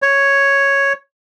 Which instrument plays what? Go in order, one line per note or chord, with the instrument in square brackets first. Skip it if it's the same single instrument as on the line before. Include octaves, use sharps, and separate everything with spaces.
[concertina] C#5